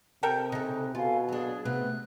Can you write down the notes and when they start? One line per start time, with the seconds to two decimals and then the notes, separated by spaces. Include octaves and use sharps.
0.23 C3 A4 A#4 G5
0.52 C#3 D#4 A4 G5 F#6
0.95 B2 F4 A4 F5 G#5
1.29 F#3 D4 G#4
1.65 C3 A3 B3 F#6